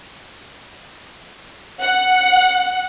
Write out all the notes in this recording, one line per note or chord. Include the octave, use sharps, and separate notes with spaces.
F#5